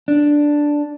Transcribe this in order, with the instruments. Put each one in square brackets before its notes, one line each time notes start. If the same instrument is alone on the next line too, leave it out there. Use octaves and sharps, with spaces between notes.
[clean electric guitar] D4